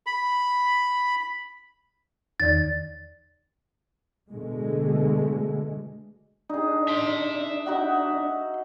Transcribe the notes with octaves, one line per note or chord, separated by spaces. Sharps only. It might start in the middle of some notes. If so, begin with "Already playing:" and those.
B5
E2 D#3 D5 A6
B2 D3 G#3 A3
D4 D#4 G#4
E5 C6
D#4 F#4 F#5